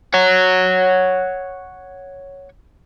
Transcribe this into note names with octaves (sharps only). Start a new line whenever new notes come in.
C#5 F#5